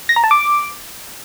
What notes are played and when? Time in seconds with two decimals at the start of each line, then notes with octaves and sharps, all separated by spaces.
0.09 A#6
0.16 A#5
0.24 A5
0.31 D6